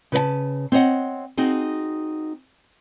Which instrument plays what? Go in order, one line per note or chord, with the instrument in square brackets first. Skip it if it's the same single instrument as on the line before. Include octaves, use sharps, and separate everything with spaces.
[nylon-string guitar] C#3 B4 C5 A5
C4 C#5 D#5 F#5
C4 D#4 F#4 G#4